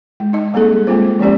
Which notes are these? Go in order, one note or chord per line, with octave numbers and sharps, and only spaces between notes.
G#3
D#4 D#5
G3 A#3 C4 G#4 A4
G#3 A#3 C4 F4 C5
F3 G#3 B3 C#4 G4 D5